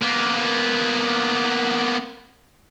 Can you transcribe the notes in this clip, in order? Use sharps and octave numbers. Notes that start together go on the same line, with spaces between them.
A#3 B3